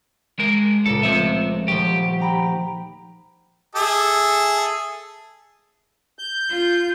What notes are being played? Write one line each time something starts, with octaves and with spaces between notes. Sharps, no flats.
G#3 A#4
C#2 A#2 A4
F3 A3 C4 E5
D#1 F3 G4 C#6
G5 A#5 B5
G#4 A4 E5
G6
F4